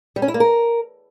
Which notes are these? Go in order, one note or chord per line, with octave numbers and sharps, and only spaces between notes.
G3
C#4
E4
A#3
A#4